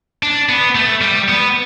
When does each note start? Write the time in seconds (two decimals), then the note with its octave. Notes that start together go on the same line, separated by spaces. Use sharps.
0.23 D4
0.49 B3
0.75 A3
1.01 G3
1.28 B3